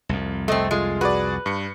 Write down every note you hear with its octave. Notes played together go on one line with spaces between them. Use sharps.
C2 F2
A3 C4 A4 D#5
G#3 F4
F#4 G#4 B4 D5
G2 C#7